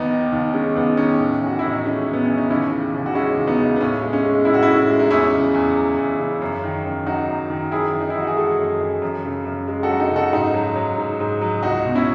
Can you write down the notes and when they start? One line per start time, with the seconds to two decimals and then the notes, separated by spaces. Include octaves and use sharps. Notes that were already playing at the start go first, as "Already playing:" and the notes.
Already playing: D#2 B3 D#4
0.10 D#3
0.32 D#2
0.54 G#3 C#4
0.75 D#2 B3
0.97 D#3 C#4
1.19 A2
1.42 E3 F#4
1.59 A2 E4
1.72 D#4
1.85 G#3 C#4
2.06 A2
2.13 B3
2.25 E3 C#4
2.38 D#4
2.50 D#2 C#4 E4
2.71 C#3
2.94 D#2
3.06 F#4
3.15 G#3 C#4 E4
3.37 D#2
3.47 B3 D#4
3.59 C#3
3.76 B3
3.81 A2 C#4
4.02 G#3
4.13 C#4
4.24 G#3
4.45 A2 E4
4.54 F#4
4.63 A2 C#4 E4
4.90 G#3
4.99 D#4
5.11 E2 C#4 E4
5.33 C#3
5.54 E2
5.75 F#3
5.97 E2
6.19 C#3
6.42 F#2
6.64 D#3
6.85 F#2
7.06 F#3 D#4 F#4
7.28 F#2
7.50 D#3
7.72 F#2 E4 G#4
7.94 E3
8.01 D#4
8.10 E4
8.15 F#2 F#4
8.27 G#4
8.37 G#3 F#4 A4
8.59 F#2
8.81 E3
9.02 F#2
9.25 C#3
9.45 F#2
9.68 G#3
9.83 F#4 A4
9.90 F#2
10.00 D#4 F#4
10.11 C#3
10.16 F#4 A4
10.33 G#2 D#4 F#4
10.54 F#3
10.76 F#3
10.98 G#2
11.20 G#2
11.41 F#3
11.63 C#2 D#4 F#4
11.85 B2
11.95 C#4 E4